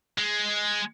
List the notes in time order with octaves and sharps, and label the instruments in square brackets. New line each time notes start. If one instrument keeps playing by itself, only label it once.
[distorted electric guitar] G#3